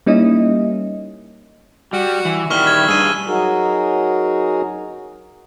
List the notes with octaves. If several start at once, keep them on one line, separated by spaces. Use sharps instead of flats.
G3 A#3 C#4 D#4 E4 D#5
G3 F#4
E3
D#3 G3 E4 C#6 F6 G7
G#6
G2 D4 G#4 E6 D#7
F#3 D#4 F#4 G#4 A#4